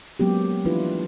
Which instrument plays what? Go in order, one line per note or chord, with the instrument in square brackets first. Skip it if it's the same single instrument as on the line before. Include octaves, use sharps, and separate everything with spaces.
[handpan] F#3 G#3 A#3 B3 C#4 G4
E3 F3 D4 E4 F4 B4